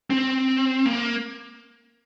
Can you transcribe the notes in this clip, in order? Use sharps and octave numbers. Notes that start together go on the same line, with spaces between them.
C4
A#3